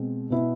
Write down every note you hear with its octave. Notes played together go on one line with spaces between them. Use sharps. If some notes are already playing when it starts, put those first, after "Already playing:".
Already playing: B2 G#3 C4
B2 B3 E4